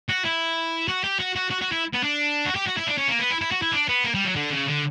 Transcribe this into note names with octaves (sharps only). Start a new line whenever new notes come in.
F#4
E4
F#4
G4
F#4
F#4
F#4
F#4
E4
B3
D4
F#4
G4
F#4
E4
D4
C#4
A#3
B3
E4
E4
F#4
E4
D4
B3
A#3
G3
F#3
D3
C#3
D3